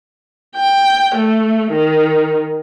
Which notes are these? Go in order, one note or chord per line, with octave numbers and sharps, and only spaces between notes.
G5
A3
D#3